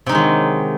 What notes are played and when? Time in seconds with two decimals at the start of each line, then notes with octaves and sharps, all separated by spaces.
0.06 C3
0.09 D#4
0.12 G#3
0.15 D#3
0.17 F#3